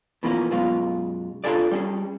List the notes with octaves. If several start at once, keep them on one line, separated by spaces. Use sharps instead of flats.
B2 E3 F3 A#3 C#4
F#2 B2 G#3 F4
D4 D#4 F4 G#4 A4 D5
G3 C#4 G#4